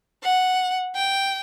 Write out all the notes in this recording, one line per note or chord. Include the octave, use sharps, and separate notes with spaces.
F#5
G5